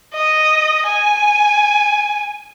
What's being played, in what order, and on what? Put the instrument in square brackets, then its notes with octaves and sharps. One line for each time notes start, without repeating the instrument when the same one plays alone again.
[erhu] D#5
G#5